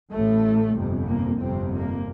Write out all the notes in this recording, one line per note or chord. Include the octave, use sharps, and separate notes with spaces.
A1 A2 A3
G1 F2 C3
A#3
G1 F2 C3 C4
A#3